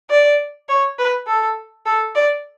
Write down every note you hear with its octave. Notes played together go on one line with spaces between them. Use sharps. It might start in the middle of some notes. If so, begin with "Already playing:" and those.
D5
C#5
B4
A4
A4
D5